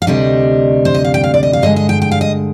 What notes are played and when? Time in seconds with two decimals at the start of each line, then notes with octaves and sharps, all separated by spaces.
0.02 F5
0.07 D2 C3 G3 D4 D#5
0.85 C5
0.94 D#5
1.04 F5
1.14 G5
1.24 F5
1.34 D5
1.43 D#5
1.53 F5
1.62 G2 D3 G#3 D#5
1.76 D#5
1.89 G5
2.02 G5
2.11 F5
2.21 D#5